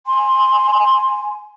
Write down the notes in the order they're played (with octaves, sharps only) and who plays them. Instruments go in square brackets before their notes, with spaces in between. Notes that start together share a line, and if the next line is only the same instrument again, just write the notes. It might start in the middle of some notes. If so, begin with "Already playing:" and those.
[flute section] G#5 C6